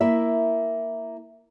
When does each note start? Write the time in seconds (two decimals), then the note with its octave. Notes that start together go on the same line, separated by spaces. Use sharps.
0.01 A#3 E4 E5